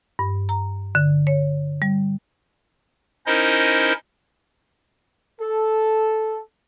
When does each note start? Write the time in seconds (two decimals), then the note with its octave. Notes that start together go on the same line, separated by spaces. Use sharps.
0.19 G2
0.49 A#5
0.95 D3
1.27 C#5
1.82 G3
3.26 C#4 D#4 E4 A#4 C5 D#5
5.40 A4